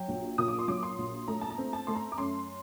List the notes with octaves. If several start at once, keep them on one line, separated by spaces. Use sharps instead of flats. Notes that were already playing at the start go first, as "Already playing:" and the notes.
Already playing: F#3 G5
A#1
A#2 D#6
D6
C6
F#3 D6
C6
A#1
A3 A#5
A5
A#5
C4
A5
A3 C6
A#5
D6
F#2 C6